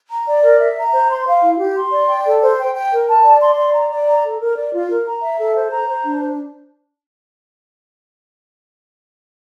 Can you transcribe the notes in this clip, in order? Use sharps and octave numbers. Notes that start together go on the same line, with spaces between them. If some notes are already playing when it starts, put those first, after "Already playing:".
A#5
D5
A#4
E5
A#5
C5
C6
F5
E4
G4
C6
D5
G5
A4
C5
G5
G5
A#4
A5
D5
C6
D5
A#5
D5
A#5
A4
A#4
D5
F4
A#4
A#5
E5
A4
C5
A#5
C5
D4